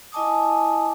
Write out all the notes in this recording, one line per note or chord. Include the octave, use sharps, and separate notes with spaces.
E4 D#5 G#5 A5 D6 D#6